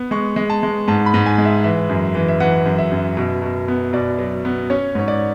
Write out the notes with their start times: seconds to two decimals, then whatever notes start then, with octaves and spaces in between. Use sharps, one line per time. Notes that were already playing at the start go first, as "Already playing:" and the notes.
Already playing: B3
0.11 G#3 C#6
0.36 G#3
0.50 A5
0.63 G#3
0.88 G#2 A5
1.06 B5
1.14 G#2
1.26 G#5
1.38 G#3
1.45 E5
1.64 E3 E5
1.90 F#2
2.15 E3
2.28 E5
2.40 E3 F#5
2.66 F#2
2.78 E5
2.92 F#2
3.17 B2
3.42 B2
3.68 B3
3.93 B2 D5
4.19 F#3
4.45 B3
4.70 C#4 C#5
4.95 G#2 C#5
5.08 D5